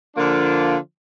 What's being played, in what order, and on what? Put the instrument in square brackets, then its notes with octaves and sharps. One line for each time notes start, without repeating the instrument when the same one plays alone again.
[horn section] D3 F3 A#3 D4 F4